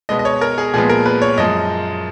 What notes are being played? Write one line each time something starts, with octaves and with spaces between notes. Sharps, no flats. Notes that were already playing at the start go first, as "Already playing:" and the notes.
B2 G#3 B3 D#5
D#5
C#5
A#4
G#4
A#2 F3 G#3 B3 G#4
A#4
B4
C#5
F#2 F3 G#3 D#5